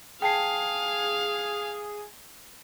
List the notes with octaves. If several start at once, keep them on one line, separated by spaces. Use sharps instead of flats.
G#4 F5 G5 A5 C7